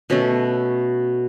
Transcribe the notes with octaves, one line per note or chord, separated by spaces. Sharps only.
B2 A3 C#4